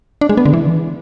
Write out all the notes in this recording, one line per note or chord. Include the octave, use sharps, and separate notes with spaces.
D4
G#3
B3
D3
E3